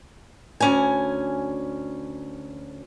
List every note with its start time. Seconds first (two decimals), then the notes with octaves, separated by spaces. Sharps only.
0.60 D2 C#4 G#5